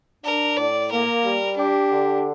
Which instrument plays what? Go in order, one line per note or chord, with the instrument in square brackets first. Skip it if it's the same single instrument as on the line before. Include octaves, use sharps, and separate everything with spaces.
[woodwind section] D4 [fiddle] A#4
[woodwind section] A2 [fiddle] D5
[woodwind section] A#3 [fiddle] A#4
[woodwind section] G3
[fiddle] D4 [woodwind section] G4
[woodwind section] D3